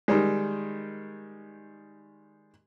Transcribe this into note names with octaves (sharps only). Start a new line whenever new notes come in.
D#3 G3 G#3